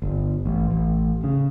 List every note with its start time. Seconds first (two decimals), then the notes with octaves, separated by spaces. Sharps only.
0.02 G1
0.46 A1
0.70 A1
1.24 C#3